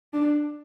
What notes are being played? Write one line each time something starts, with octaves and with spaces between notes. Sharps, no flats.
D4